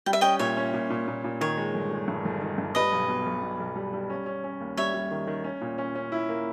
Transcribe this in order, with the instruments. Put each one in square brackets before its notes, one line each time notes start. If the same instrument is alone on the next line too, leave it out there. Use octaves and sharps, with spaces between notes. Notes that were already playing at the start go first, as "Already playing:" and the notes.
[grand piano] G3 [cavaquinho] G5
[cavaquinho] E5
[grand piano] C#4 [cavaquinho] D#5 G5
[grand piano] A#2 [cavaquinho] C#5 E5
[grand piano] C#4
A#2
A#2
A#2
A#2
[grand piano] D#3 [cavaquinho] C#5
[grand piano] G#3
G1
G#3
G2
G1
D#3
G2
[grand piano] G3 [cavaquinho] B4 D#5
[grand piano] B1
B2
B1
B2
B1
G3
G3
C#4
C#4
C#4
D#2
[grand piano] G3 [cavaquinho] C#5 E5
[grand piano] G3
D#3
D#3
C#4
A#2
C#4
C#4
E4
A#3